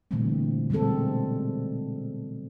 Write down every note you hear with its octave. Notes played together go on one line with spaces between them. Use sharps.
A#2 D3 E3 G3 A3 C4
B2 G3 G#3 C4 A4